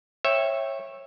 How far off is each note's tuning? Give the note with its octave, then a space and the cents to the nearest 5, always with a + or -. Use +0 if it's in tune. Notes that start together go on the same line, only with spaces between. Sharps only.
C#5 -20 E5 +0 G5 +0